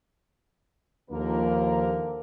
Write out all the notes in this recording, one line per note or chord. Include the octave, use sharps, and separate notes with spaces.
D#2 D3 F3 A#3 A#4